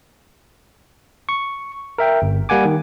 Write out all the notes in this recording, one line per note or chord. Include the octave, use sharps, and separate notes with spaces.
C#6
A#4 E5 G5
G1
G3 A#3 F#5 G#5 D6
D#3